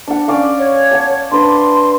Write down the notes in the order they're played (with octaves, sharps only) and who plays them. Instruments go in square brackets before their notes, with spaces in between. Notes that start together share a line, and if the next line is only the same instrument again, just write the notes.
[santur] D4 F#5
C#4 D5 F5
[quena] C#5
[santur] F#5 A5
[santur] D4 B4 [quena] C6